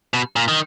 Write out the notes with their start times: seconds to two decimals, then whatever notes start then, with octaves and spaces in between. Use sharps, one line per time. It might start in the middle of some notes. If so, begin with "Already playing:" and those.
0.14 B2
0.36 A#2
0.48 D#3